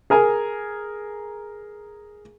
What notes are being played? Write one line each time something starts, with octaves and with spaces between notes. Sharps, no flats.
G#4 A#4 G#5 A#5